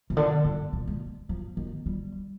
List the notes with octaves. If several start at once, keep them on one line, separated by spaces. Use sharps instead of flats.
C3
D3
G2
A#2
G#3
F3
D#3
G3